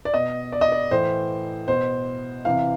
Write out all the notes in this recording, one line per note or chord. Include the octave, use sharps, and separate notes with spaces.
D5
B2 D#5
D5
D#5
D5
A2 E3 C5
B2 C5
C3 E3 F5